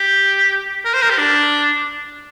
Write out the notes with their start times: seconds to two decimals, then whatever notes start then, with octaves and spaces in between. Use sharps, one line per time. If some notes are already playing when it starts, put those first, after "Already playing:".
Already playing: G4
0.85 A#4
0.94 C5
1.02 A#4
1.10 G4
1.19 D4